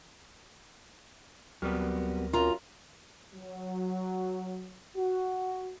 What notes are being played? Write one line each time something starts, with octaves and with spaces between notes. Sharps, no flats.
D2 F#3 G3 B3 C4 A#4
F#2 F4 A#5
F#3
F#4